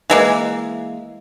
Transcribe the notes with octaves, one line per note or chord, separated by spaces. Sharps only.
E3 G#3 A#3